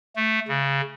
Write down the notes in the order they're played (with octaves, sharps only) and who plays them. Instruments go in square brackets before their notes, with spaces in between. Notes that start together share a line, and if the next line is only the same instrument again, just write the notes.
[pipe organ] A3
C#3